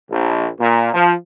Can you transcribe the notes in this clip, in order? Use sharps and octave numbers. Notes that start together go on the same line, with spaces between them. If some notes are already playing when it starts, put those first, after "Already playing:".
A#1
A#2
F3